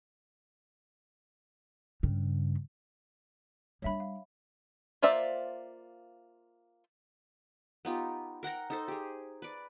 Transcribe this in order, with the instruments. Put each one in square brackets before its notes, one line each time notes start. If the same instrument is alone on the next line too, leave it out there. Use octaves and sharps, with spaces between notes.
[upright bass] G2 C#3
[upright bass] G3 D4 [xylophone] C#5 E5 B5
[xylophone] F5
[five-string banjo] A#3 F4 C5 D5 E5
[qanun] B3 D#4 F4 G4
A#4 F#5 G5 A#5
D#4 A4 C5
G4 G#4
B4 D5